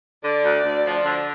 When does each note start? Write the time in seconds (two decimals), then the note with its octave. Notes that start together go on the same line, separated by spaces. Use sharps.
0.24 D3 D5
0.43 D2
0.64 D2
0.85 F3
1.05 D3